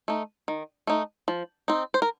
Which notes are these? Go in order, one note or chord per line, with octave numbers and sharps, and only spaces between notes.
A3 D#4
D#3
A3 D#4
F3
C4 D#4
C5
A#4